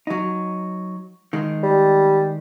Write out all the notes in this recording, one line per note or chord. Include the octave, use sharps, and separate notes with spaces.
F#3 D#4
D#3 G#3
G3